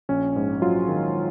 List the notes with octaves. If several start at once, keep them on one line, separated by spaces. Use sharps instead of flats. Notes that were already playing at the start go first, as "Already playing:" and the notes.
A#1 C#4
G#2
F#3 F4
D#3